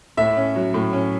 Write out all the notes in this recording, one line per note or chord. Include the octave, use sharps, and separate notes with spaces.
A2 E5
C#4
F#3
A2
C#4